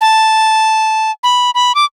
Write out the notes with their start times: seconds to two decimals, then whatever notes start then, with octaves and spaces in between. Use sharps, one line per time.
0.01 A5
1.23 B5
1.55 B5
1.75 D6